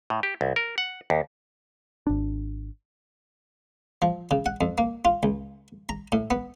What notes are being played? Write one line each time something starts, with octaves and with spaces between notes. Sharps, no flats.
A2
G4
C2
A#4
F#5
D#2
G#1 D4
F3
C#3
F#5
F2
A#3
F4
C#2
A#5
A2
B3